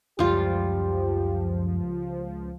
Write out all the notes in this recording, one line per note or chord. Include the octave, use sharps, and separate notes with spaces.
C#2 F#2 F3 G3 F4 G4